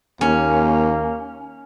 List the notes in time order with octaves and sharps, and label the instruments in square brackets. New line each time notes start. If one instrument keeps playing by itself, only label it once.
[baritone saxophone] D#2 [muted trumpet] A#3 [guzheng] C#4